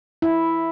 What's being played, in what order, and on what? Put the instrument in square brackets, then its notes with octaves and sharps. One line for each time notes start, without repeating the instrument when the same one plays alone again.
[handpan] E4